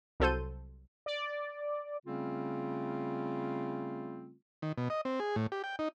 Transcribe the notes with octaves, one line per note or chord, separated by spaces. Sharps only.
C2 F#3 A4 C5 G6 D#7
D5
C#3 G3 A3 C4 C#4 F4
D#3
B2
D#5
C4
G#4
A2
G4
G5
D#4